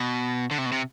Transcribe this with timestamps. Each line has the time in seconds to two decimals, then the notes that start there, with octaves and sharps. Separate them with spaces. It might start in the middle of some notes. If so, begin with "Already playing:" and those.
Already playing: B2
0.51 D3
0.58 C3
0.66 B2
0.72 C3